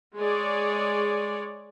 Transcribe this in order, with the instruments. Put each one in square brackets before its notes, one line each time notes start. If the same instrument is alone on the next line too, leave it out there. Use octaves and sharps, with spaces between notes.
[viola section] G#3 G#4 C#5 D5